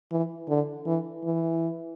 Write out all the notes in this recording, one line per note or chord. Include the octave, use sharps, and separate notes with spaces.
E3
D3
E3
E3